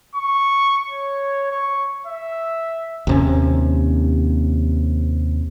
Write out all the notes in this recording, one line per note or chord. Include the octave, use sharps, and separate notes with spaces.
C#6
C#5
C#6
E5
D#2 C3 C#4